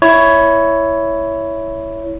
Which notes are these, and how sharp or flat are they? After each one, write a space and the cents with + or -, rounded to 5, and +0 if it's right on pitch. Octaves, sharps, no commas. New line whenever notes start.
E4 +0 C#5 +10